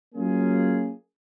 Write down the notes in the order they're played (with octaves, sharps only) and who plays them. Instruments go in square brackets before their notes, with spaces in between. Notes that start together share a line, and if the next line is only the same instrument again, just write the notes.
[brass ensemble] F#3 A#3 C#4 F4 G#4